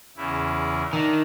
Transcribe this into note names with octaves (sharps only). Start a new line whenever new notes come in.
E2 C#3 E4
D#3 D4 E5